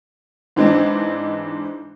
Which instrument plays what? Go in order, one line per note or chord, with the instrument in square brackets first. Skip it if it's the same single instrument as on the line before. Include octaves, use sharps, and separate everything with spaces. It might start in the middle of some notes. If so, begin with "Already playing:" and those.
[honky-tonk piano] G#2 E3 G#3 C4 D4